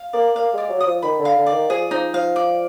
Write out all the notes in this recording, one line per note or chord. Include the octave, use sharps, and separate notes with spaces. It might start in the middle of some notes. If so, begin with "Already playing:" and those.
Already playing: F5
A#3 D5
A#3 F5
G#3 D5
F#3
D#6
F3
D#3 B5
D3
F5
D3
D5
D#3
F3 G#4
F3 D#4
F3 F5
D5